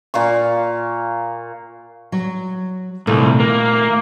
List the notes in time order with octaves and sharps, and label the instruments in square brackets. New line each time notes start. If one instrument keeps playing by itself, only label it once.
[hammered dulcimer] A#2 F5 C#6
[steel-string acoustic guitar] F#3
[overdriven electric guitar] C2 [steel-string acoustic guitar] A#2 D#3 A3
[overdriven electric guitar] A#3